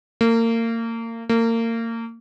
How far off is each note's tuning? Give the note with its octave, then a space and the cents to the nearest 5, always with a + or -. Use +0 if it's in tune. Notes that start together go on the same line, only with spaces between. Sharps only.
A#3 -30
A#3 -30